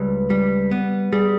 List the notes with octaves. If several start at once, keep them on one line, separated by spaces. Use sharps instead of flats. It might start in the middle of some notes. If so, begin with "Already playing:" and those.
Already playing: C#2 G3 B4
G3
B3
G3 G#4